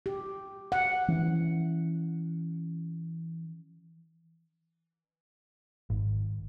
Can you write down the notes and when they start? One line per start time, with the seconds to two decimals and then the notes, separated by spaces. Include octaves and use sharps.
0.06 G4
0.72 F#5
1.08 E3 C#4
5.90 G#1